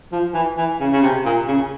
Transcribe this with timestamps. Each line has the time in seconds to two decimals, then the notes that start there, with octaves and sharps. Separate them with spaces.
0.12 F3
0.34 E3
0.57 E3
0.80 C#3
0.93 C#3
1.03 C3
1.25 A#2
1.47 C#3